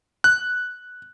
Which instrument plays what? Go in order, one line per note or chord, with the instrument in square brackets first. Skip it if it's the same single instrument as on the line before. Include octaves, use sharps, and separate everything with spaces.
[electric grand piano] F#6